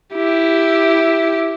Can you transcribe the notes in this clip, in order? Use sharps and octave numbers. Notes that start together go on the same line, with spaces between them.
E4 G4